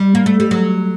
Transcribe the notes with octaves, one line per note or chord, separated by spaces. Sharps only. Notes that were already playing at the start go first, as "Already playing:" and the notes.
Already playing: G3
A#3
A3
G3
F#3